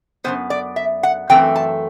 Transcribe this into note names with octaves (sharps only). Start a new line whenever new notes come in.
F#2 E3 B3 C5
D5
E5
F#5
F#2 E3 A3 C4 G5
A5